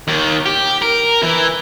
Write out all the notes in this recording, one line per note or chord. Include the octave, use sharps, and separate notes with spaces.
D#2 D#3
G4
A#4
E3 E4